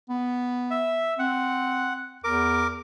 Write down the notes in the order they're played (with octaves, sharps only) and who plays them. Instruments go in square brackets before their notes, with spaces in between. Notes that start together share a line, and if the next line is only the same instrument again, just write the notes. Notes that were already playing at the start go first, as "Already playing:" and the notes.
[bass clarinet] B3
[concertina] E5
[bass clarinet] C4 [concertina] F#5
[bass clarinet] E2 [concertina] A#4 D6